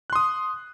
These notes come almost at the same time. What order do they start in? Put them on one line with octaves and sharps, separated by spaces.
F#6 C6 D#6